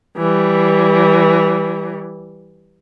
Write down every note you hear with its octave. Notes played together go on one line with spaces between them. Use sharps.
E3 G3